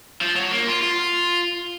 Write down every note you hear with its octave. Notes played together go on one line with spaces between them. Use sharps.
F3
F#3
A#3
F4
F4